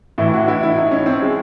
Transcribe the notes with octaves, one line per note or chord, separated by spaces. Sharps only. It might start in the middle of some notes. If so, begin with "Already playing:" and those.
A2 E3 E4
F#4
E4
E4
D#4
C#4
C4
G#3